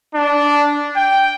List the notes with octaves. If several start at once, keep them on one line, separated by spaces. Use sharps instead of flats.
D4
G5